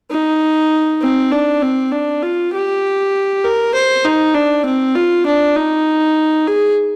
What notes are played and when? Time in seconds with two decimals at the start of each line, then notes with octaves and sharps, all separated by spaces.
0.11 D#4
1.01 C4
1.31 D4
1.62 C4
1.92 D4
2.23 F4
2.53 G4
3.44 A#4
3.74 C5
4.05 D#4
4.34 D4
4.65 C4
4.95 F4
5.26 D4
5.56 D#4
6.47 G#4